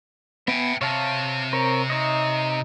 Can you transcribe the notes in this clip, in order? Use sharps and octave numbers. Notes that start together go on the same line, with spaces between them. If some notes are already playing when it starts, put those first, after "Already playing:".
B3 E5 G5 G#5
C3 C#5 F5 A5
C4 A#4 C#5
D#4 C#5 D#5